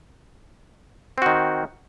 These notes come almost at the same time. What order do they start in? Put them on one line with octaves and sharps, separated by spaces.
C4 F#4 D#3